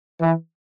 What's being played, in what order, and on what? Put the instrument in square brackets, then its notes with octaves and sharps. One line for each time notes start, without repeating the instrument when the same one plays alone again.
[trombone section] E3